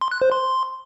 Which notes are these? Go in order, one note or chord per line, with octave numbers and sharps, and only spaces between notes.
C6
F#6
C5
C6